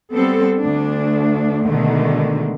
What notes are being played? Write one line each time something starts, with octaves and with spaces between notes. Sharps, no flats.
G3 B3 C4 A4
D2 D4
B2 D3 D#3 G#3 A3